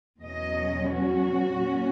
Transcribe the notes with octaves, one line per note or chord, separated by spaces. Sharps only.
E2 B2 F#3 C#4 D#5
F#4
A#2 F#3 C#4